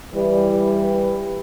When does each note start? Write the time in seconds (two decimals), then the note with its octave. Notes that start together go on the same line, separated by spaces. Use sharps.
0.14 E3 G3 B4